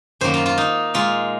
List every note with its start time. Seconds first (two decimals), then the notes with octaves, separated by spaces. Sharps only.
0.21 F#2 D#3 F#3 A#3 C5
0.34 F4
0.46 F4
0.58 D#4
0.94 A#2 G#3 F4